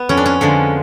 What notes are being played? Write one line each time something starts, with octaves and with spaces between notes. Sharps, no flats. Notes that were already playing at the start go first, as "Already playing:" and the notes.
Already playing: B3
F2 C#4
D4
C#4
D3 F3 G#3